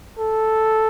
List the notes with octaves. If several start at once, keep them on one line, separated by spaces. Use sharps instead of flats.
A4